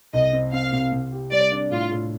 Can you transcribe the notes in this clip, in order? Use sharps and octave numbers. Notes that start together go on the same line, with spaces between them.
C2 D#5
C4
C4 F5
C3
C3
G4
G3 D5
D4
A2 F4
A2